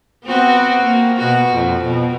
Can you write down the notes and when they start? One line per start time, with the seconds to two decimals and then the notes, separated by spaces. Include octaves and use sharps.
0.24 B3 C4 F#4
0.84 A#3
1.17 B2 F#4
1.54 F2
1.84 B2